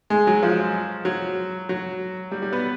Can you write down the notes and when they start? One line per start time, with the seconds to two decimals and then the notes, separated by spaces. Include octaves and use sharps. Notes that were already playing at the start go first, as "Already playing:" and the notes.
0.10 G#3
0.27 F#3
0.43 F3
1.05 F#3
1.69 F#3
2.31 G3
2.42 G3
2.53 B3